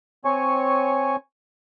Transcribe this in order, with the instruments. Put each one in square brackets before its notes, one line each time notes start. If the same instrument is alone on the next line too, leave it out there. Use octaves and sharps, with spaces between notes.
[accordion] C4 C#5 G#5 C#6